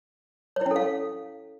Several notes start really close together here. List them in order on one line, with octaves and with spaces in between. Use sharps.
C#5 E4 C#4 A4 F5